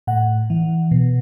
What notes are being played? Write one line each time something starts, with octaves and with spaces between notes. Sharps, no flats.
A2 F#5
E3
B2